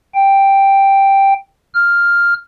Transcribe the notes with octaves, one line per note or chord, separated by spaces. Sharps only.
G5
F6